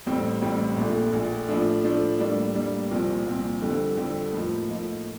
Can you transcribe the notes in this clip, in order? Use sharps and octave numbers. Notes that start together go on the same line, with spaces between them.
A1 A2 G3 C4
A1 A2 G3 C4
A#1 A#2 A3
A#1 A#2 A3
A2 F3 A3 D4
A2 F3 A3 D4
A2 G3 A#3 D4
A2 G3 A#3 D4
C2 A#2 F3 C4
C2 A#2 F3 C4
F2 D3 G3 C4
F2 D3 G3 C4
A2 F3 A#3 D#4
A2 F3 A#3 D#4